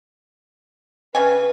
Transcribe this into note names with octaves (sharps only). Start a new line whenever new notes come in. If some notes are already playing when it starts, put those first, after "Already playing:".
C#3 B4 G#5